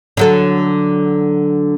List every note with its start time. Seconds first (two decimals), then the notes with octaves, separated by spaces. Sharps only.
0.17 D3 F#3 A4